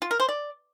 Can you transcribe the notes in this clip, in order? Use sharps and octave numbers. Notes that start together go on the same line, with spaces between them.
F4
A#4
C5
D5